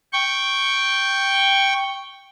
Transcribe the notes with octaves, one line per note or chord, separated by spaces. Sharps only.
G5 C#6